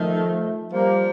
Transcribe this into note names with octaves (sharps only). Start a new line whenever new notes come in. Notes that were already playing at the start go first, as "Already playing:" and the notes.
Already playing: D#3 F3 A3
F3 G3 A#3